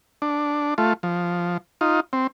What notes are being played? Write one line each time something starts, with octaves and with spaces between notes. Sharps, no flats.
D4
A3 F4
F3
D#4 F4
C4